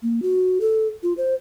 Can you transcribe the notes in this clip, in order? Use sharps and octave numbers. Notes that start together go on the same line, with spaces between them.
A#3
F#4
A4
F4
C5